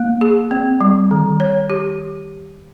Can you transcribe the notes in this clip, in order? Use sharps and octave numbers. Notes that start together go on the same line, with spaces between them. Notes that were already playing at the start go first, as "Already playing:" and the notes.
Already playing: A#3
G#4
C4
G3
D#3
C#5
G4